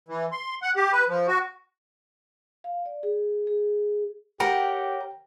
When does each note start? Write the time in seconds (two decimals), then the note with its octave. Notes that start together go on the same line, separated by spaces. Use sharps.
0.09 E3
0.32 C6
0.62 F#5
0.76 G4
0.93 B4
1.08 F3
1.28 F#4
2.64 F5
2.86 D5
3.03 G#4
3.47 G#4
4.40 G4 A#4 C#5 D#5 F#5 G5